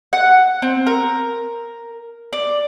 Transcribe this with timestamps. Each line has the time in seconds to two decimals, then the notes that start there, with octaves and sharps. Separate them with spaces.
0.13 F#5
0.62 C4
0.87 A#4
2.33 D5